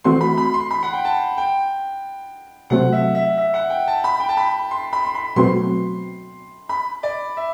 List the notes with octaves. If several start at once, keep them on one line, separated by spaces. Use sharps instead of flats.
E3 A3 C4 F#4 C6
B5
B5
C6
B5
F#5
G5
A5
G5
C3 F#3 A3 C4 F#5
E5
E5
E5
F#5
G5
A5
B5
G5
A5
B5
C6
B5
C6
B5
B2 F#3 A3 C4 F#4 C6
B5
D5
E5